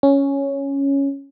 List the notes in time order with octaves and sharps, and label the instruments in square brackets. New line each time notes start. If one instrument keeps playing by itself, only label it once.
[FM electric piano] C#4